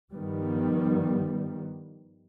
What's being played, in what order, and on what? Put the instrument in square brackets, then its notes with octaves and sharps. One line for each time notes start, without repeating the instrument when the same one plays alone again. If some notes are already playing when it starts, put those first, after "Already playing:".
[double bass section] G2 D#3 F3 G3 B3